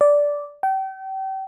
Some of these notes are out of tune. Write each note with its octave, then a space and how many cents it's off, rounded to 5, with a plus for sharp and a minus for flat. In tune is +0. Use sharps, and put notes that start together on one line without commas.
D5 -10
G5 -35